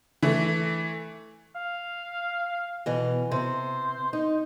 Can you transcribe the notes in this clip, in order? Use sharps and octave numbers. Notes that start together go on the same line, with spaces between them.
E3 A3
F5
B2 E3
C3 C5
D#4